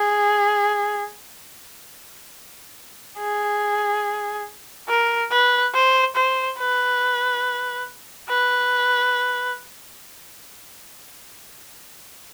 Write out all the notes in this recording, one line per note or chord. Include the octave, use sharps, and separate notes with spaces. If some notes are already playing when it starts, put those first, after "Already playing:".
Already playing: G#4
G#4
A#4
B4
C5
C5
B4
B4